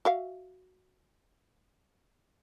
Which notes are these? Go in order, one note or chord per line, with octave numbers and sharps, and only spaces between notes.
F#4 E5 F5